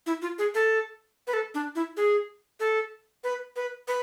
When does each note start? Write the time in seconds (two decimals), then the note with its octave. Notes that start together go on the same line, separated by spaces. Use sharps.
0.07 E4
0.22 F4
0.38 G#4
0.55 A4
1.27 B4
1.33 A4
1.55 D4
1.75 E4
1.97 G#4
2.60 A4
3.24 B4
3.56 B4
3.88 B4